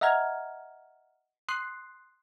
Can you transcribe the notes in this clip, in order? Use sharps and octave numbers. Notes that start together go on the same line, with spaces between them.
D#5 E5 F#5 A#5 F6 G#6
C6 D#6 F#6 C7